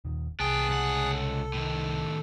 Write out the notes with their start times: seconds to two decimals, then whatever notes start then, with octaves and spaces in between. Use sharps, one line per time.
0.05 D#1 D#3
0.40 C2 B3 G#4 G5 A5 F#6
0.70 C#2 F#5
1.13 A4
1.54 A2 D#3